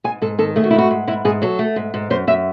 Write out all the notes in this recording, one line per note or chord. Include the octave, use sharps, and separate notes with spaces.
G#2 G#5
G#2 A4
D#3 A4
A3 G#4
F#4
G#2 E4
F#4
G#2
G#2 E4
G#2 G#4
F#3 A4
A3
G#2
G#2
F#2 C5
F#2 E5